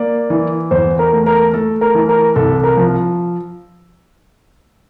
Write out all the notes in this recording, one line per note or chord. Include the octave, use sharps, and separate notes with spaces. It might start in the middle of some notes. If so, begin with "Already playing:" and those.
Already playing: A#3 D5
E3
E2 C5
A#4
A3
A#4
A3 A4
A#4
E3
A#4
C2 A4
A#4
F3